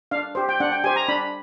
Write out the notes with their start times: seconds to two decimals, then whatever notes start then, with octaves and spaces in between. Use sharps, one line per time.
0.11 D4 F5
0.35 G4 C5
0.49 G5
0.60 D4 F#5
0.72 G5
0.84 G4 C5 G#5
0.96 A#5
1.08 D4 B5